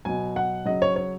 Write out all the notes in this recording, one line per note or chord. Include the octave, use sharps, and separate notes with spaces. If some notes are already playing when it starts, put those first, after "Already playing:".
B2 F#3 G#5
F#5
C#3 F#3 D#5
C#5
C#5